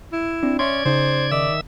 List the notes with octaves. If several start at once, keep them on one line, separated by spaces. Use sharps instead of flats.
E4
C4 D4
C#4 D5 E5 C6 G#6
C#3 D#4 C5
D#3 D5 E5 E6